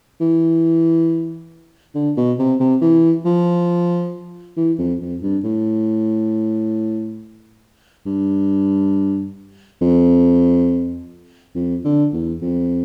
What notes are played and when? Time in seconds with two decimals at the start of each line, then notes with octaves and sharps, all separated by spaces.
0.20 E3
1.95 D3
2.17 B2
2.39 C3
2.60 C3
2.82 E3
3.25 F3
4.57 E3
4.79 F2
5.01 F2
5.22 G2
5.44 A2
8.06 G2
9.81 F2
11.55 F2
11.85 D3
12.13 E2
12.42 F2